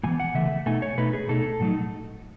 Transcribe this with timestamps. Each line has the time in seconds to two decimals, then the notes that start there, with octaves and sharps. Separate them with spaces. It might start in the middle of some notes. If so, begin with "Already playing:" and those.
0.03 A2 E3 B3 G#5
0.20 F#5
0.35 C#3 E3 A3 E5
0.66 B2 A3 D#4 G#5
0.82 C#5
0.98 B2 A3 D#4 B4
1.13 G#4
1.29 B2 A3 D#4 A4
1.60 A2 F#3 A3 D#4